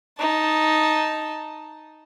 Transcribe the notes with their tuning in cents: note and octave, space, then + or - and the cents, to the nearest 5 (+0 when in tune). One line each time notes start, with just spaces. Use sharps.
D#4 +0 A5 +0